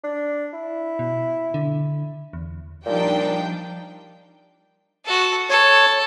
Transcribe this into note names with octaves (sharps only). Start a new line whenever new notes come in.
D4
E4
B2
D3
E2
A#2 F3 G3 D4 D#4 G5
F#4 A4
A4 C#5